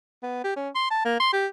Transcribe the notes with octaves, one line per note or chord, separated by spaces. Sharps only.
B3
G4
C#4
C6
A5
A#3
C6
G4